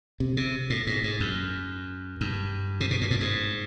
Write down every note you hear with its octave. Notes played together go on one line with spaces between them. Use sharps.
C3
C3
A2
G#2
G#2
F#2
G2
C3
B2
A#2
A2
G#2